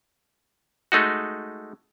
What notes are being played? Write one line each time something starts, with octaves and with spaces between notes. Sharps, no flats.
G#3 A3 D#4 F#4